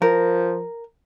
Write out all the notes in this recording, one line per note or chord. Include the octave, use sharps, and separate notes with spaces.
F3 A#4